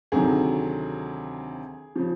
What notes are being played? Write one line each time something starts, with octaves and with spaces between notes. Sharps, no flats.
D2 C3 D#3 F#3 G#4
C#3 F3